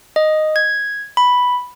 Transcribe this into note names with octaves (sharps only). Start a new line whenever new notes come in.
D#5
G#6
B5